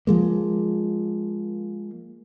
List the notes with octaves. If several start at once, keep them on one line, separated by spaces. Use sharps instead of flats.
F3 G#3 A#3